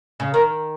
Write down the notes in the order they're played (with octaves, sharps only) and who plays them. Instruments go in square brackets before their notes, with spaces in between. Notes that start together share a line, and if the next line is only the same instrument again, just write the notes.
[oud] C#3
[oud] D#3 [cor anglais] A#4